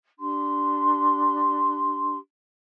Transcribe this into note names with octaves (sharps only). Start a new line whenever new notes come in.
D4 G4 C6